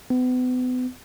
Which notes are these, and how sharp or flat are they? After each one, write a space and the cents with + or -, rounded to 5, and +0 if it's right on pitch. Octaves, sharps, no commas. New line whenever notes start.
B3 +35